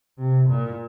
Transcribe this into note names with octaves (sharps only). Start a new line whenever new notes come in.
C3
A#2